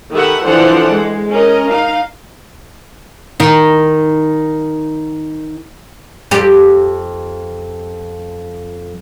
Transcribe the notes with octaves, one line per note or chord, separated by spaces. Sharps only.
D#3 G4 A4 E5 F#5 B5
E3 F3 D4 A4 C5 F#5
G#3
C#4 A#4 D#5
D#4 F5
D#3 D#4
F2 G4